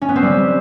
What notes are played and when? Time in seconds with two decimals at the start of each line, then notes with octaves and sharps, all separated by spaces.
0.02 C#4
0.09 B3
0.16 C4
0.23 G3